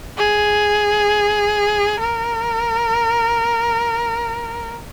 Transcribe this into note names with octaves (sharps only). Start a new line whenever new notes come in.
G#4
A#4